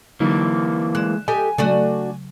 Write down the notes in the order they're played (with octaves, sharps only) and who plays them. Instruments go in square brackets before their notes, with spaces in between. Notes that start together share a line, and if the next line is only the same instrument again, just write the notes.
[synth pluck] D3 F#3 D#4 [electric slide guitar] E3 A#3
[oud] G#3 [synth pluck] F#6 E7
[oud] G4 A4 D#5 [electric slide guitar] G#5
[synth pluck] C#3 F#3 [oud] A3 D4 F#4